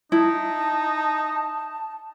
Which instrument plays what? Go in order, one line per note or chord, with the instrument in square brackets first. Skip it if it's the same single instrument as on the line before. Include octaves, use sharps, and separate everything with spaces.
[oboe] D#4 [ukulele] E4 [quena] A5